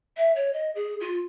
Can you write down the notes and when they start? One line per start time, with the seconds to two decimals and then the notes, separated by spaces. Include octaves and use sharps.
0.17 E5
0.36 C#5
0.53 D#5
0.75 G#4
1.00 F4